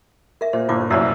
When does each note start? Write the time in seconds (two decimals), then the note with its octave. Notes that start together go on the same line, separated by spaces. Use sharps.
0.41 A#4 E5
0.53 A#2 C5
0.69 G1 A#2 E4 F4 D6
0.90 C2 F#2 C#5 D5 E5